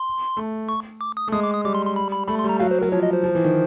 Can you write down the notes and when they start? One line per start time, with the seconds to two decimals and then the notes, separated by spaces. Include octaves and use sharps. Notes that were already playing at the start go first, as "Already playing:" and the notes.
Already playing: C6
0.37 A3
0.69 C#6
1.01 D6
1.17 D#6
1.28 A3
1.32 G#3 D#6
1.43 D6
1.54 D#6
1.65 G3 D6
1.75 C6
1.85 C6
1.96 B5
2.12 B5
2.28 A3 B5
2.39 C6
2.44 G3
2.49 A#5
2.60 F#3 F5
2.71 C5
2.81 F#3 A#4
2.92 F3 C#5
3.03 D#5
3.13 C5
3.24 F3
3.35 E3
3.44 D#3